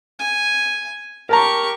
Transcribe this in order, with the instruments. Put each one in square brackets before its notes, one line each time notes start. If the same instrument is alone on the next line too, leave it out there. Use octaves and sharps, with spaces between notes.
[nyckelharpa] G#5
[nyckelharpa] G4 C#6 [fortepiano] A#4 A5 A#5